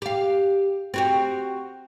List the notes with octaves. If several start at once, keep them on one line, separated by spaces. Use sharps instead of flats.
G4 F5
C4 F#4 G4